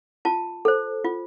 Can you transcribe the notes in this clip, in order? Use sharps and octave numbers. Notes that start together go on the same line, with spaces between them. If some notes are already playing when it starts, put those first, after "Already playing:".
F4 A5
A4 C5
F4